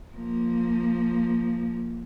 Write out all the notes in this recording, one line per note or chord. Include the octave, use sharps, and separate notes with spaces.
F3 A#3